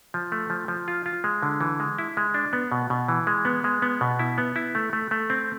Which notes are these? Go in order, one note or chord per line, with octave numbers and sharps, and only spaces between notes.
F3
A3
F3
F3
F4
F4
G#3
D3
E3
G#3
E4
G#3
D4
B3
B2
B2
E3
G#3
B3
G#3
B3
B2
E4
B3
E4
A3
A3
A3
C4